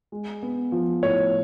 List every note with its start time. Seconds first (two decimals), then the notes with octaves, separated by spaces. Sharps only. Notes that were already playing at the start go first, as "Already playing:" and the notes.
0.12 G#3
0.43 B3
0.72 F3
1.03 A2 C#5